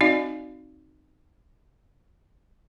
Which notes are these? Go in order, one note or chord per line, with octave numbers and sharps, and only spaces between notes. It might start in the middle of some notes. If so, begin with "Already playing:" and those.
C4 D#4 F#4 D5 D#5 F5